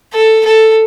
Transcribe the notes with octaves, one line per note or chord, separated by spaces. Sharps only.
A4
A4